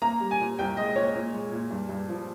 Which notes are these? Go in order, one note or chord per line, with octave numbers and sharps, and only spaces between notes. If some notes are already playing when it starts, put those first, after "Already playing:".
A#3 A#5
G3
G#5
A#2
C2 G5
G#3 D#5
A#2 C#5
A#2
G#3
A#2
G2
G2
F3